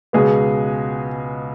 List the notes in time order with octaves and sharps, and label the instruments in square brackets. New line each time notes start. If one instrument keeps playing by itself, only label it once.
[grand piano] C#2 B2 G#3 B3 G#4